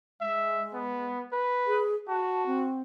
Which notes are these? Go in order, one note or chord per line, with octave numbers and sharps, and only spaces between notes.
G#3 E5
B3
B4
G#4
F#4 A5
C4